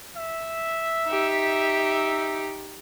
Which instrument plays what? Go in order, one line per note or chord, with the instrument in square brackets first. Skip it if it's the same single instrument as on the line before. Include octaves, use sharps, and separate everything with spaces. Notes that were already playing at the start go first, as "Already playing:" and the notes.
[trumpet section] E5
[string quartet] D#4 G4